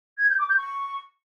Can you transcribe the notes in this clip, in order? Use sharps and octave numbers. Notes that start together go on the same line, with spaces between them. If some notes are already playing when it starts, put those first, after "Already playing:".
G#6
G6
D6
G6
C#6